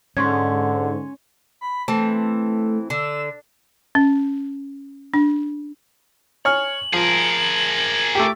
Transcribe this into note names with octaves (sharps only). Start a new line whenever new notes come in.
G#2 D3 C#4 C6 C#6 G#6
B5
E3 A3 C4 A5
D3 E6
C#4
D4
C#5 G#5 F6 F#7
F3 G#4 A#4
A3 G4 D6